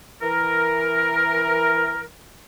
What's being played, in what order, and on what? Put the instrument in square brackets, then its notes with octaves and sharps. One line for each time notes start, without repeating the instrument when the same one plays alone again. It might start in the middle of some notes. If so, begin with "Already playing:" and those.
[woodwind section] E3 A#4